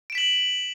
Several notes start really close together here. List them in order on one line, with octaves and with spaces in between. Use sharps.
D7 E7 B6 F#7